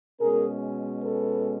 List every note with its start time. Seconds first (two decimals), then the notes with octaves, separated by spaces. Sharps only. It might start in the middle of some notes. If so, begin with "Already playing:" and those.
0.20 B2 G#3 C#4 G#4 A#4
1.02 A4 B4